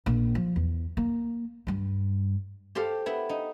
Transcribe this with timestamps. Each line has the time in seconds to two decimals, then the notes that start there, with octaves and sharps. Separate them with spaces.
0.06 A#1
0.35 F3
0.56 E2
0.97 A#3
1.67 G2 G3
2.75 G4 A4 C5 F5
3.06 B3 E4
3.29 D#4